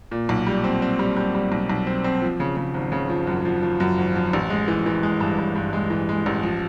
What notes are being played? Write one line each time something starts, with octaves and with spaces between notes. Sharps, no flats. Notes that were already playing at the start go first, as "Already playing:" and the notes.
A#2
B1
G3
C4
C4
G3
G3
G3
B1
B1
C4
C4
F3
C#3
C#3
G#1
C#3
F3
F#2
F3
F3
F#2
G#1
F3
A1
G#3
E3
E3
G#3
G2
G2
G2
G#3
E3
G#3
A1
F3